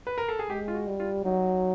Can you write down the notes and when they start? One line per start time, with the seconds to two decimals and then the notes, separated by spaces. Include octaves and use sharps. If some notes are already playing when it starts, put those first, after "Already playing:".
0.07 B4
0.18 A#4
0.29 A4
0.39 G#4
0.50 G#3 G4
0.68 F4
0.74 F#4
0.87 G3
1.00 F4
1.25 F#3 D#4